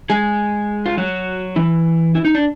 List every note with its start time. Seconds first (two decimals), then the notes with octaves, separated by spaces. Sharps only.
0.10 G#3 G#4
0.86 F4
0.98 F#3 F#4
1.56 E3 E4
2.15 E4
2.25 D#4
2.35 D4